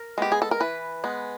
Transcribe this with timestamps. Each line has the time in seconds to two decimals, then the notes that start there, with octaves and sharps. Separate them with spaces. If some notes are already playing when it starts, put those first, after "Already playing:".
Already playing: A#4
0.18 G#3 B3 G4
0.32 G#4
0.42 A4
0.51 A#4
0.60 E3 B4
1.04 G#3 B3